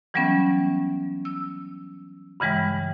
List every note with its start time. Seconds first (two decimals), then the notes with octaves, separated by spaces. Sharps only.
0.14 E3 F#3 G3 B3 C#4
1.25 E6
2.40 G2 C#3 E3 G3 G#3